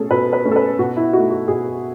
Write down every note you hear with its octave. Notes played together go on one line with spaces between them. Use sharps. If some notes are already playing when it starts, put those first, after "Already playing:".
Already playing: B2 A3 C#4 G#4 A4
B2 B4
B4
A3 C#4
A4
B4
B2 F#4
E4
A3 D#4 F#4
F#4
B2 G#4